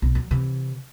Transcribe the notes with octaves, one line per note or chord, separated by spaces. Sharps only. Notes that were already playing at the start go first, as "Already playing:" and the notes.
B1
F#3
C3 E3